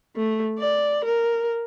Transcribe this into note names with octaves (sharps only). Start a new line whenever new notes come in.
A3
D5
A#4